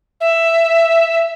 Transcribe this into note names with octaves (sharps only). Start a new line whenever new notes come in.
E5